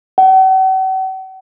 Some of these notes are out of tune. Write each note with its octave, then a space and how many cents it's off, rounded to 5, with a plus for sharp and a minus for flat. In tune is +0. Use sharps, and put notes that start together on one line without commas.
F#5 +45